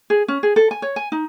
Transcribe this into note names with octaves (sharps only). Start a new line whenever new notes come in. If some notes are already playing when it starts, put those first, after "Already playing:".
G#4
C#4
G#4
A4
G#5
C#5
G#5
D#4